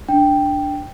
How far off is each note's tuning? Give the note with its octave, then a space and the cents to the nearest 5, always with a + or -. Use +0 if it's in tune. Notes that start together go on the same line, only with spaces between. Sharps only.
D4 +0 G5 +0